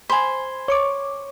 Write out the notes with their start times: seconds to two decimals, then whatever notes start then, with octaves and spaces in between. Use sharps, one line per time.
0.10 C5 G#5 B5
0.68 C#5 C#6 D6